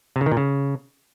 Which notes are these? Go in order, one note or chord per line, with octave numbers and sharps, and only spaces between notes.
C3
C#3
D#3
A#2
C#3